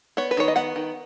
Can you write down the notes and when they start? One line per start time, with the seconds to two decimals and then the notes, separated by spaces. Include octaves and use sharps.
0.17 B3 C#5
0.31 B4
0.37 D#3 C#5
0.48 D#5
0.56 B3 F#5
0.76 D#3